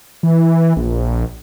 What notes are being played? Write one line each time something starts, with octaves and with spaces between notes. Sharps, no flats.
E3
A#1